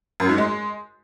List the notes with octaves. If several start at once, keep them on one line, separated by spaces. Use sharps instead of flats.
F#2
G#2
G#3